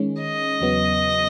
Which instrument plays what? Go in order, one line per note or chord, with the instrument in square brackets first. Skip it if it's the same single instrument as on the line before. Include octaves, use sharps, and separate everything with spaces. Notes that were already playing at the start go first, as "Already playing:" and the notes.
Already playing: [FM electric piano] D#3 G#3 C#4
[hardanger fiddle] D#5
[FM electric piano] E2 C#3 F#3 B3